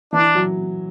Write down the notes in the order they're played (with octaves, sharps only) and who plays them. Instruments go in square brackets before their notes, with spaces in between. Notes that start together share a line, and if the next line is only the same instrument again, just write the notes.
[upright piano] E3 [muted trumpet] D4
[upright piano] F#3